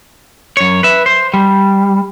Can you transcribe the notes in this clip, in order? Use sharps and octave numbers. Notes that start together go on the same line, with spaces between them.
F#2 C#5
B4 E5
C5
G3